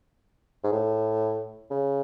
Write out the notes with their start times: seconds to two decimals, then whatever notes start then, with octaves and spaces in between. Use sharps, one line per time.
0.64 G#2
0.72 A2
1.71 C#3